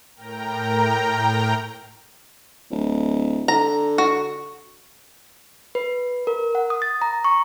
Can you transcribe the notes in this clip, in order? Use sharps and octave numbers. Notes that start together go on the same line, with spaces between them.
A2 A#4 G5 A#5
D1
D3 A#5
F#4
B4
A#4
F#5
D#6
A6
A#5
C#6